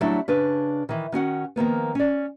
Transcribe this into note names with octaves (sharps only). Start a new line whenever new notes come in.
F#3 G3 A3 D4 E4
C#3 D4 B4
D#3 E3
D#3 C#4 F#4 F#5
D#3 F3 A#3 B3
C#4 D5